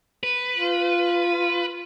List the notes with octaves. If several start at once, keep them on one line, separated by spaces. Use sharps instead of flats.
B4
F4